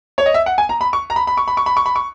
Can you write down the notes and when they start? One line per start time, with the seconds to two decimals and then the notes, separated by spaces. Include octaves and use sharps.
0.18 C#5
0.26 D#5
0.34 E5
0.46 F#5
0.58 G#5
0.69 A#5
0.81 B5
0.93 C#6
1.10 A#5
1.16 B5
1.27 B5
1.37 C#6
1.48 B5
1.57 C#6
1.66 B5
1.77 C#6
1.86 B5
1.96 C#6